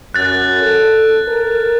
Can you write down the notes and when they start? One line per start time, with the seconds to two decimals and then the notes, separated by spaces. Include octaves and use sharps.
0.14 F#2 F#6 A6
0.61 A4
1.27 A#4